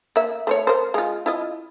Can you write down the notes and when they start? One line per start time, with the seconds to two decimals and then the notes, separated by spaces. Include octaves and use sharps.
0.16 A#3 E5
0.47 A3 C5 C#5
0.67 A#4 C5
0.94 G#3 F4
1.26 E4 F4 D#5